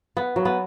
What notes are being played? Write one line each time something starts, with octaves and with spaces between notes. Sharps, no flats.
B3
F#3
B3